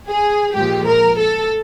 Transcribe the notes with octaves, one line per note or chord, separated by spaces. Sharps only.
G#4
A#2 F3 G#3 G4
A#4
A4